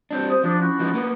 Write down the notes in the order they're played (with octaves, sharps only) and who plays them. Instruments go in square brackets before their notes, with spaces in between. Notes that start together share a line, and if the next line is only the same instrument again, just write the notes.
[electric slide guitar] G3 C4 D4
[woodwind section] C5 D#6
[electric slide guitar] F3 [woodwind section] D4
[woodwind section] C#4 E4 F#4
[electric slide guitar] F3 B3 D#4
A#3 B3